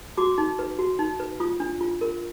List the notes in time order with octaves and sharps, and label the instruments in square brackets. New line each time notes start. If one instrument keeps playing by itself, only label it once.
[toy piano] F#4 D6
D#4
B4
F#4
D#4
B4
F4 D#6
D4
F4
A#4